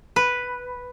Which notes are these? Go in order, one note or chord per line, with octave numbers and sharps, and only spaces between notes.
B4